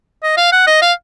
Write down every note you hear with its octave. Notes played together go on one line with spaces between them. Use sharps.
D#5
F5
F#5
D#5
F5